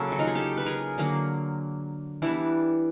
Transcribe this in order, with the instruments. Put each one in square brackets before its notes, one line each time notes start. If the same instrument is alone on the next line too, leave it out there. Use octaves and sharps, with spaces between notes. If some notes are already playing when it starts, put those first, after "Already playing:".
Already playing: [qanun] C#3 F#3 A#3 A4
F#4
D#4 F4
G#4
G4 A4
B4
G#4 A#4
D3 F#3 A#3
E3 G3 B3 D4 E4